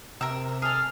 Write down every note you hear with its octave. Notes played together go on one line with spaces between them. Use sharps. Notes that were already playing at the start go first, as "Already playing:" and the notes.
C3 A#4 E6
G#4 A4 F6